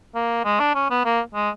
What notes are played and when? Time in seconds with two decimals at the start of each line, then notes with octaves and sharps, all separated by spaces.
0.15 A#3
0.45 G#3
0.60 D4
0.75 C#4
0.90 B3
1.05 A#3
1.34 G#3